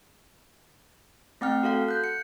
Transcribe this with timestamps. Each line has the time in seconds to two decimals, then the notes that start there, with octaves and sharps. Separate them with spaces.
1.41 A3 C4 F#5 G5 F6
1.63 F#4 A4 F5 F#5
1.88 F#6 G6
2.04 C#7